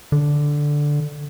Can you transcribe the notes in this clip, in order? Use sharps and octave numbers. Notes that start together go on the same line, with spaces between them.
D3